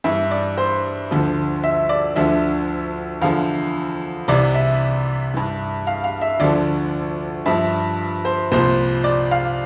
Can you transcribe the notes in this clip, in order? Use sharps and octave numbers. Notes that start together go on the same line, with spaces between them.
G2 E3 E5
D5
C5
D2 D3 F3
E5
D5
D2 D3 F3 E5
E2 D3 F3 F5
C2 C3 E3 D5
E5
G2 E3
F5
F5
E5
D2 D3 F3 D5
G2 F3 E5
C5
C2 A#2 F3 C5
D5
F5